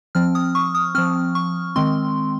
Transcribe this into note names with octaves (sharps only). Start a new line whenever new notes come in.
F3 C4 F6
D#6
C#6
D#6
F3 C4 F6
C#6
D#3 G#3 C4 C6